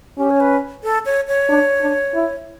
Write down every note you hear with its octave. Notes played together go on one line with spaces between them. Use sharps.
C#4 G4
C#5
B4
A4
C#5
C#5
D4
D4
E4